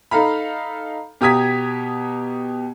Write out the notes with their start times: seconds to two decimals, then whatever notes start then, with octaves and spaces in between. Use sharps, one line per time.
0.11 D#4 A4 F5 A#5 B5
1.21 B2 G4 A#5 D#6 G#6 B6